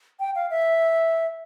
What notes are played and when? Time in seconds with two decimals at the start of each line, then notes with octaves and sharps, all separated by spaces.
0.20 G5
0.35 F5
0.50 E5